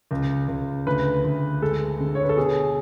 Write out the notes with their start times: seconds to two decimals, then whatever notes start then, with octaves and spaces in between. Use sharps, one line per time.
0.11 C#2
0.48 C#2
0.86 D2 B4
1.24 D2
1.62 G#3 A4
2.00 D3
2.15 C#5
2.23 B4
2.29 A4
2.37 B2 G#4